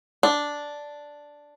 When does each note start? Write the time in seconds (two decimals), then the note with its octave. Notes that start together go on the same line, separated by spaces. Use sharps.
0.23 D4